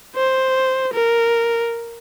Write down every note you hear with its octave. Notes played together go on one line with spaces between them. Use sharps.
C5
A#4